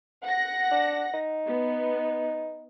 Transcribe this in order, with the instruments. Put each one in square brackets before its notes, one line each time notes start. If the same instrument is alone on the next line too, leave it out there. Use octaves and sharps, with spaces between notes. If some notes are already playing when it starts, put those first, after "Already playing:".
[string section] F#5 A#6
[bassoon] D4
D#4
[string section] B3